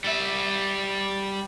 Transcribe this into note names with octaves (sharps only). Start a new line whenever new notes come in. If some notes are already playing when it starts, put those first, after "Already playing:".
G3 E5